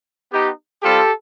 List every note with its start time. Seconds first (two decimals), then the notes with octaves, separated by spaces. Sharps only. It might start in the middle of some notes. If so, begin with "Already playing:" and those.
0.32 B3 D#4 G4
0.82 G3 C4 F4 G4 A4